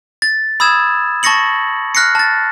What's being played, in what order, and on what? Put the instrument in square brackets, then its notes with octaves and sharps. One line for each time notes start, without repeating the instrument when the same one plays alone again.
[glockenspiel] A6
B5 D#6 E6 G#6 E7
A5 C#6 A6 A#6 C#7 F#7
F6 F#6 A#6 C7 C#7
A5 A6